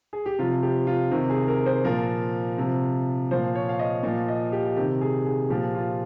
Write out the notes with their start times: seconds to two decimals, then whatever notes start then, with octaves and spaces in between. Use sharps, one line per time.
0.13 G#4
0.26 G4
0.39 C3 F4
0.42 F3
0.63 G4
0.87 F4
1.11 C3 D#3 G4
1.30 G#4
1.48 A#4
1.66 C5
1.84 A#2 F3 A#4
2.58 C3 F3
3.31 A#2 F3 C5
3.55 C#5
3.69 F5
3.79 D#5
4.03 A#2 F3
4.28 D#5
4.52 G4
4.76 C3 D#3 G4
5.01 G#4
5.25 G#4
5.50 A#2 F3 G4
5.75 F4